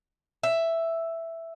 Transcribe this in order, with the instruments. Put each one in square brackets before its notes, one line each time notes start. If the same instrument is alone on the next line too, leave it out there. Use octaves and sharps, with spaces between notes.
[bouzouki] E5